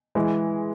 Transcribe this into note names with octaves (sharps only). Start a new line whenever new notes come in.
E3 G#3